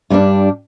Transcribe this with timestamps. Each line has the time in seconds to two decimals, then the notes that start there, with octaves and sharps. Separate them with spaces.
0.10 G2 G3 D4